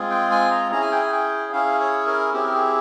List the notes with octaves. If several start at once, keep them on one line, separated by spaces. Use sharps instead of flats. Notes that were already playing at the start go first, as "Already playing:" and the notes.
Already playing: G#3 C4 F4 G#4
G5
G#5
A#5
C#4 E4 G#4 A#5
G#5
G5
G#5
G5
C#4 E4 G#4 F5
C#5
A#4
C4 E4 G4 G#4
A#4
G#4